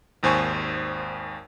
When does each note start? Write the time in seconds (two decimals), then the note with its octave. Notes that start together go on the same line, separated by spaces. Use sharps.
0.23 G#1 D#2 C5 G#5 C#6